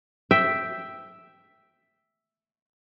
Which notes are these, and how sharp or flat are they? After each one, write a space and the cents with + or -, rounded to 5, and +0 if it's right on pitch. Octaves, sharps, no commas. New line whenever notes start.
E5 +0 G5 +0